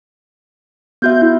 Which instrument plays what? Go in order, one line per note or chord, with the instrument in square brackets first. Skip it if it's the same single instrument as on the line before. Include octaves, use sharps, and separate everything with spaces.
[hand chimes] B3 F#4 E5 [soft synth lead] G6
[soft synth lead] E4